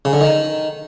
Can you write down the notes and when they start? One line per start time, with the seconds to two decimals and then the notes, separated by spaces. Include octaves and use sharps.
0.05 C#3
0.13 D3
0.21 D#3